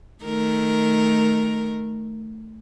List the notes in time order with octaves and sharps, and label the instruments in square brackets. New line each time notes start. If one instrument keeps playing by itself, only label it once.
[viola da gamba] D#3 A3 A#4